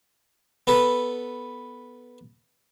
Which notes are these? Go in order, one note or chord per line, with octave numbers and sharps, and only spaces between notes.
B3 A4 B4